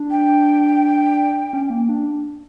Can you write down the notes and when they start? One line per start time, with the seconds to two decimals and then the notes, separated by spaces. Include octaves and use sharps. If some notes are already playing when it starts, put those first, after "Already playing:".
Already playing: D4
0.11 G5
1.53 C#4
1.70 A#3
1.89 D4